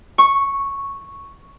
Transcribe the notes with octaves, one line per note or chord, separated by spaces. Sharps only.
C#6